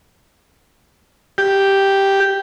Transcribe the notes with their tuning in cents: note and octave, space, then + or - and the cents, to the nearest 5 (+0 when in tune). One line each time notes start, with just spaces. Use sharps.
G4 +0